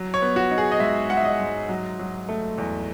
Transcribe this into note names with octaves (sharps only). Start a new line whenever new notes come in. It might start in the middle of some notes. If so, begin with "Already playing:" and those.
Already playing: F#3
C#5
B3
F#4
D#4
G#4
D#5
G#2 E5
G#2 F#5
E5
D#5
G#2
F#3
F#3
A3
E2